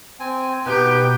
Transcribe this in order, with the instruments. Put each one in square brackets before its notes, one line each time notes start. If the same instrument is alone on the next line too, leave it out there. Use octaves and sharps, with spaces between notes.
[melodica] C4 G#5
[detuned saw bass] B2 [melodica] B3 D#4 B4 [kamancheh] G4 G5